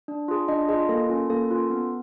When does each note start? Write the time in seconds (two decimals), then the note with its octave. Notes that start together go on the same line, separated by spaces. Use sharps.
0.08 D4
0.28 F4 G#4
0.48 D4 D#5
0.69 F4 G#4 D#5
0.89 A#3 A4
1.09 C#4 F4
1.30 A#3 A4
1.50 C#4 F4
1.70 B3